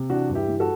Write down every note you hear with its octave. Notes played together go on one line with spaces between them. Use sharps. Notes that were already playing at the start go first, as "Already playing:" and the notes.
Already playing: C3
E3 D4 F#4
G2
E4 G4
E3
F#4 A4